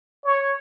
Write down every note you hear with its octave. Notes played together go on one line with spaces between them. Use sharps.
C#5